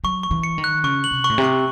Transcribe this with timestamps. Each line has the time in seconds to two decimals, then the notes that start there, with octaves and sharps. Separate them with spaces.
0.04 F#3 C#6
0.23 C#6
0.31 E3
0.43 C#7
0.58 D#3
0.64 F#6
0.84 C#3 C#6
1.04 F#7
1.11 C3
1.24 C#6
1.30 A2
1.38 C3
1.44 C#6